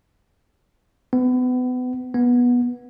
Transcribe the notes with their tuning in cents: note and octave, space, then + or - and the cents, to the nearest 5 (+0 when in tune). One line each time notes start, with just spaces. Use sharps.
B3 +30
B3 -15